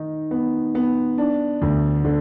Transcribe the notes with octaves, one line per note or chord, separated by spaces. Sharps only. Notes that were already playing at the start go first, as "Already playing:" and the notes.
Already playing: D#3 D#4
B3
B3
D4
D2
D3